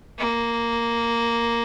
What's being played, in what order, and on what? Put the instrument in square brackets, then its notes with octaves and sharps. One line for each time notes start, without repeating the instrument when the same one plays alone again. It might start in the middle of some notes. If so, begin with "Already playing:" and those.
[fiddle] A#3